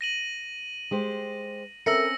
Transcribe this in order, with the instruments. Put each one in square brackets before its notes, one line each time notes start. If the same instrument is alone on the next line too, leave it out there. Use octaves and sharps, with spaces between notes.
[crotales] A#6 D#7 F#7
[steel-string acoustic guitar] G#3 G4 C5
[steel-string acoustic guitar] C4 C#4 [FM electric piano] A4 A#4 E5 [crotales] E6 A#6 C#7